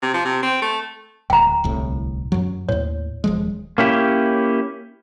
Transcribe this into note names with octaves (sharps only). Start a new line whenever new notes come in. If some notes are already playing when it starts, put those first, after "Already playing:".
C3
F3
C3
C4
A3
D1 G5 A#5
D1 C2 A2
F#2 F#3
D#2 A2 C#5
D#1 F3 G#3
A#3 C#4 E4 G4